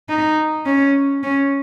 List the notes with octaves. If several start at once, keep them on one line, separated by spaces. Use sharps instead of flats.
D#4
C#4
C#4